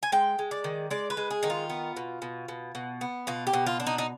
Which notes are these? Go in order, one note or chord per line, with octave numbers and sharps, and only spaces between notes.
G#5
G#3 G5
G#3
D5
D#3
G#3 D5
B4
G#3
G#4
D#3 D#4
F4
B3
B2
B2
B2
B2
B3
B2 F4
G4
B2
F4
D4
D#4
D#4